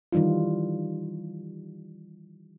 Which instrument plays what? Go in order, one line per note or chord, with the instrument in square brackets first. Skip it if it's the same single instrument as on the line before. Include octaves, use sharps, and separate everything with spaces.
[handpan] D#3 E3 G3 D#4 F4